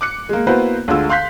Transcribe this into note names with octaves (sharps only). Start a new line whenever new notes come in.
D6 F#6 C#7
G#3 A#3
A#3 B3 E4 F#4 B4 C5
D2 D3 G#3 F4 E6
F5 C6 F#6 G6 B6